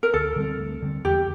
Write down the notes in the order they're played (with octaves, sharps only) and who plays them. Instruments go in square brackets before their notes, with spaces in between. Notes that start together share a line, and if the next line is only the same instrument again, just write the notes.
[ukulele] A#4
[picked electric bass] D2 [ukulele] A4
[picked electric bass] D3 G3 C4
D2
D3 G3 C4
[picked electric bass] E2 [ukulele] G4